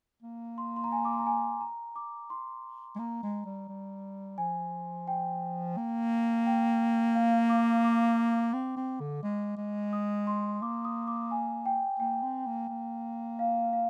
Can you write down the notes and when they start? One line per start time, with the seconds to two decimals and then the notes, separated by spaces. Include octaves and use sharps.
0.23 A#3
0.58 C6
0.76 C6
0.84 A#5
0.92 G#5
1.05 D6
1.13 C6
1.19 A#5
1.27 G#5
1.61 A#5
1.96 D6
2.30 C6
2.96 G#3
2.99 A#3 A#5
3.23 G#3
3.46 G3
3.69 G3
4.38 F3 G#5
5.08 G5
5.77 A#3
6.46 G5
7.15 F5
7.50 D6
7.84 D6
8.54 C4
8.77 C4
9.00 D3
9.23 G#3
9.57 G#3
9.93 D#6
10.27 C6
10.62 A#3 D6
10.85 D#6
11.07 D6
11.31 G#5
11.66 G5
12.00 A#3 G5
12.23 C4
12.47 A#3
12.69 A#3
13.39 F5
13.73 F5